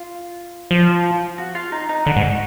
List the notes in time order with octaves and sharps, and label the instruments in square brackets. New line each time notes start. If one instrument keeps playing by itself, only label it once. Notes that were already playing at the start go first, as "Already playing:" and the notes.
Already playing: [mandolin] F4
[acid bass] F3
[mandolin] F#4
F4
D#4
D#4
[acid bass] D3 [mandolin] F#4
[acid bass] G#2